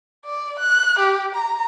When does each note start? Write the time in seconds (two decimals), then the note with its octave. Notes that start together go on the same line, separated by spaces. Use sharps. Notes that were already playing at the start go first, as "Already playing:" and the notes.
0.25 D5
0.59 F#6
0.99 G4
1.35 A#5